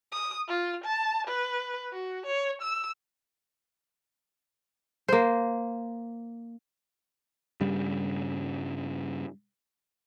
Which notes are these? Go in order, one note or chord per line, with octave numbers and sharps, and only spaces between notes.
D#6
F4
A5
B4
F#4
C#5
E6
A#3 C5
G2 C#3 G3